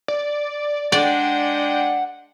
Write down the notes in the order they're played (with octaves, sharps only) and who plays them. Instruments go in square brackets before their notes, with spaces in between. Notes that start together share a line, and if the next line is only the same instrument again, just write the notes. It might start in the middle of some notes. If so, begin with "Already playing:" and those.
[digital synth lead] D5
[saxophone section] G#3 D4 [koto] D5 [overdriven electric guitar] F#5 [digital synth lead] G5